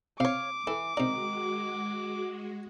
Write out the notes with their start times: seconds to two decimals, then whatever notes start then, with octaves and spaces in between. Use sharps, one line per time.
0.20 C3 C#5 F5 D6
0.67 E3 A4
0.97 C3 D#3 G#3 F#4 D5